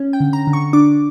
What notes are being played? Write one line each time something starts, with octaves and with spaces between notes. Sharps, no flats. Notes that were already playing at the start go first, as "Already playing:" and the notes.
Already playing: C#4
G5
D3
A#5
D3
C#6
D4 D6